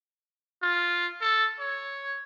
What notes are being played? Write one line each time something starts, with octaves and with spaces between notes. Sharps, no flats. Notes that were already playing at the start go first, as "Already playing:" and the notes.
F4
A4
C#5